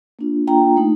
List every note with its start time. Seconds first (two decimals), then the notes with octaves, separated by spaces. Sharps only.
0.19 A#3 D4 F4
0.47 A#3 D4 F4 G5 A#5
0.77 A3 D#4